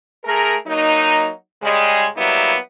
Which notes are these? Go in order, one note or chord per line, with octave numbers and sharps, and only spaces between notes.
A3 G#4 A#4
F#3 A#3 D#4
C#3 G3 G#3
F#3 G3 A#3 B3 E4